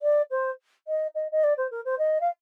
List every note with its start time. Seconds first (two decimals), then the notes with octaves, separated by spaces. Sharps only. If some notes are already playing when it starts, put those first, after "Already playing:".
0.02 D5
0.31 C5
0.88 D#5
1.15 D#5
1.32 D#5
1.44 D5
1.57 C5
1.71 A#4
1.85 C5
1.99 D#5
2.21 F5